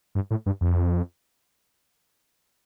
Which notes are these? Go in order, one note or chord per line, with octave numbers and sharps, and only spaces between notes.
G2
A2
G2
F2